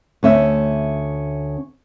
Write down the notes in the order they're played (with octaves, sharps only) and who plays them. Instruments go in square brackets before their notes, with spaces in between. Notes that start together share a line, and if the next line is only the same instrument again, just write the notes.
[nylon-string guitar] D2 C#4 E5